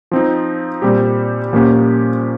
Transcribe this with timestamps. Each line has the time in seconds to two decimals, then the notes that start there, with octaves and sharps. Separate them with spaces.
0.11 F3 C4 D#4
0.82 A#2 G3 C4 G4
1.53 A#2 F3 A#3 C#4 G4